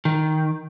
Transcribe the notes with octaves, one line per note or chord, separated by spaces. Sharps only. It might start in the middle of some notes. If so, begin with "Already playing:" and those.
D#3